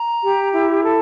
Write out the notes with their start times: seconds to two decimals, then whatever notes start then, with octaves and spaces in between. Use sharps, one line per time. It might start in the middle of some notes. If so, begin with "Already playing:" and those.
Already playing: A#5
0.23 G4
0.52 E4
0.82 A4